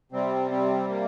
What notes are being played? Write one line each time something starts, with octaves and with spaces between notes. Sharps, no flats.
C3 G3 C4
C4
A#3